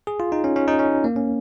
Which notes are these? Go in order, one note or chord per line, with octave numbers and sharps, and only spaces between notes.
G#4
F4
D#4
C#4
C#4
D#4
C#4
A#3
C#4